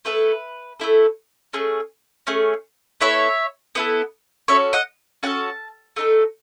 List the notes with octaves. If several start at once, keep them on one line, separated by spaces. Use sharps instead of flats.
A3 E4 A4 B4
A3 E4 A4
A3 C#4 G#4
A3 C#4 G#4
B3 E4 A4 C#5 E5
B3 E4 A4
C#4 F#4 A4 C#5 E5
D#5 F#5
C#4 F#4 A4 F#5 A5
A3 D#4 A4